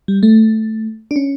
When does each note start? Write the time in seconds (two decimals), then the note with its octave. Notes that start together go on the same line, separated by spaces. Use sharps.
0.08 G3
0.23 A3
1.11 D4
1.16 C#4